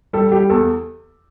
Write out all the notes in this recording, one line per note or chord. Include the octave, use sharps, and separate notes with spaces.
G3 A4
G3 G4
E2 A4